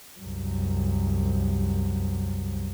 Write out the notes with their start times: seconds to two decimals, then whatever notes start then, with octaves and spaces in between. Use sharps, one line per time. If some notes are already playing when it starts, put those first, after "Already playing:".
0.20 C2 F#2